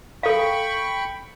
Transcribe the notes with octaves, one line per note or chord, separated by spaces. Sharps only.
A4 F5 G5 B5 C#6